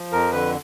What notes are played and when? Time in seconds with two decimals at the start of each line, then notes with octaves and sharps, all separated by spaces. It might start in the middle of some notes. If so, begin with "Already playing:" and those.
Already playing: F3
0.12 F2 A#4
0.32 D3 B4